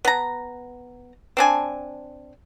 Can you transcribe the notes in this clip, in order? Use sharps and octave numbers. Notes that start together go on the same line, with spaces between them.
B3 A#5
C4 D4 G#5